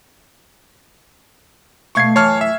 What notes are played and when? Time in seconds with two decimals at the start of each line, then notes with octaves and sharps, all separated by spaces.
1.95 B2 A3 F5 C#6 G#6 C7
2.16 F#2 E3 C#5 A5 F6
2.41 E5